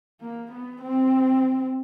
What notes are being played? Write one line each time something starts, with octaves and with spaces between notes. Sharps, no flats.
A#3
B3
C4